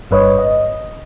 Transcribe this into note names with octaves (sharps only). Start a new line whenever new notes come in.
G1 G2 B4 C#5 D#5
D#5